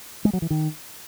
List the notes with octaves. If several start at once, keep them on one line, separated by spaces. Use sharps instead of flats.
G#3
F#3
E3
D#3